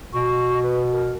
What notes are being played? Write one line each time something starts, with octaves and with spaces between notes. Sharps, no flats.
B2 C#6
B4
A#4